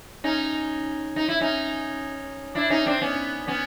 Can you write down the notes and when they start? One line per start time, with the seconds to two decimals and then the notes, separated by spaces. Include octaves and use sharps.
0.24 C#4 D#4
1.16 D#4
1.29 E4
1.41 C#4 D#4
2.55 D4 E4
2.70 C#4 D#4
2.86 C4 D4
3.01 B3 C#4
3.48 B3 C#4